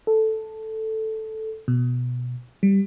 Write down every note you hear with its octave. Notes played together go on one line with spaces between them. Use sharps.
A4
B2
G3